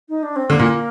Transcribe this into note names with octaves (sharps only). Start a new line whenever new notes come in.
D#4
D4
C4
D3 A#3
A#2